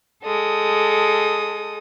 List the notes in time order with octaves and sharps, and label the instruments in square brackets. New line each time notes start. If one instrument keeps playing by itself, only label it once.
[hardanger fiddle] G#3 D#6 [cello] A4